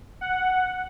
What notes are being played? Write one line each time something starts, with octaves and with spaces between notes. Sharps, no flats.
F#5